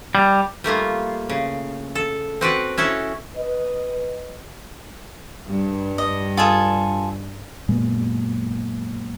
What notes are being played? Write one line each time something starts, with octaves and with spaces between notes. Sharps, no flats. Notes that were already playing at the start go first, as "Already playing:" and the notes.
G3
G3 A3 A#3 F4
C#3
A4
C4 F#4 B4 D5
C#4 E4 F#4 A4
B4 D#5
G2
D#5
F4 G#4 A4
F#2 A#2 G#3 B3